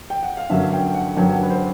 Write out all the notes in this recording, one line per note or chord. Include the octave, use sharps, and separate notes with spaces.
G5
F#5
F5
G2 D3 F#3 A#3 C#4 E5
G5
F#5
G2 D3 F#3 A#3 C#4 G5
G5
F#5
B4
C5